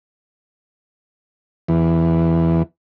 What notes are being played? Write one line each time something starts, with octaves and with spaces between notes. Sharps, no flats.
E2